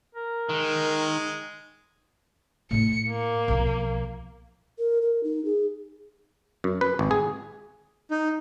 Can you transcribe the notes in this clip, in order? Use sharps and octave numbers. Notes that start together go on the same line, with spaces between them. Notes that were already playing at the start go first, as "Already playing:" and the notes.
A#4
D#3 G#3
A2 E4 C#7
A#3
B1 F3
A#4
A#4
D#4
G#4
F#2
B4
G#1
G#4
D#4